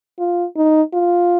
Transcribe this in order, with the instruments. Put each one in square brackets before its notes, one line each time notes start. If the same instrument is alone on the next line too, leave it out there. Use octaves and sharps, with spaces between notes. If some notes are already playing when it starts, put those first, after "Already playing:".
[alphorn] F4
D#4
F4